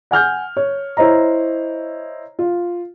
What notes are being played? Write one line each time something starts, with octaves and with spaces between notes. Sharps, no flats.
F#5 G#5 F6 G6
C#5
E4 C5 C#5 D#5 A#5
F4